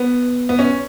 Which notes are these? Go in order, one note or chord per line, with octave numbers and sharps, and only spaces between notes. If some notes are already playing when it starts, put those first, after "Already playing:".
Already playing: B3
B3
C#4